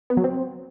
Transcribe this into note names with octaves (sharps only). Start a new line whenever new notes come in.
B3
F#3
C4